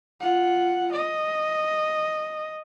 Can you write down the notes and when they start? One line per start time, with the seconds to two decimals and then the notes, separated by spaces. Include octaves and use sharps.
0.20 F4 F#5
0.92 D#5